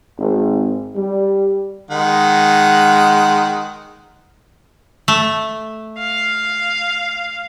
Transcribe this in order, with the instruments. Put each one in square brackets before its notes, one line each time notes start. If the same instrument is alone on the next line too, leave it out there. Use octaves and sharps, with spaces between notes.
[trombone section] G#1
G3
[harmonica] D#3 G#3 F#5
[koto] A3
[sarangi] F5